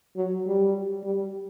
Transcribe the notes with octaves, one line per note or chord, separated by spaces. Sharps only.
F#3
G3
G3